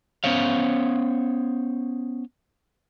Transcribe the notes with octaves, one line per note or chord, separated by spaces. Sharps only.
B3 C#4 C5 C#5 F5